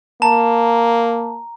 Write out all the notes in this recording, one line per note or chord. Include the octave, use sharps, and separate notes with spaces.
A#3 A5 A#5